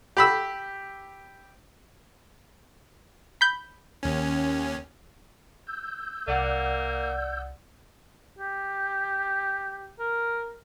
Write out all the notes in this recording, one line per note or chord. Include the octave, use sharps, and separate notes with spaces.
G4 B5 E6
B5 G6
D#2 C#4
E6 G6
C2 A#3 D5 F#5
G4
A#4